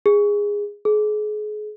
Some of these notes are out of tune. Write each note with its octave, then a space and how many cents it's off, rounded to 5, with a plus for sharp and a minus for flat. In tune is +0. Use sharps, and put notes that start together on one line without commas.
G#4 -15
G#4 +35